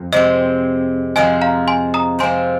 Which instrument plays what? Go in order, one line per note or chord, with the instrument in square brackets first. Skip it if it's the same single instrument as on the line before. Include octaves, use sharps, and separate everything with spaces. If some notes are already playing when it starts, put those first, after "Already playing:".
Already playing: [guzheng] F2
[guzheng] C3 G#3 C4 [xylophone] D#5
[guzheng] F2 F3 G#3 F4 G#4 [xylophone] D#5 G#5
[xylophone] F5 A#5
G#5 C6
A#5 D#6
[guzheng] C3 F3 G#3 C4 [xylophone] G#5 C6